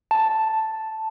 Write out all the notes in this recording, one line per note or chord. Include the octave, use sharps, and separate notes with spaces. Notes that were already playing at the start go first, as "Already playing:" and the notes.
A5